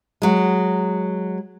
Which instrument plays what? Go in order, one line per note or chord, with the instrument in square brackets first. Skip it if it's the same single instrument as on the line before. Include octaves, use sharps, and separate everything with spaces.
[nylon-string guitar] F#3 G#3